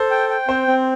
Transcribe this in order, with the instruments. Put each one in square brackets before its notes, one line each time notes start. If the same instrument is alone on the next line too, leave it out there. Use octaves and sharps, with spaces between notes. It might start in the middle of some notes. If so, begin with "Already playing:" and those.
Already playing: [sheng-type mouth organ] A4 [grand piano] C5
[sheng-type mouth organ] G5
G5
[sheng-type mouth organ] C4 [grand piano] C5
[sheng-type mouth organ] C4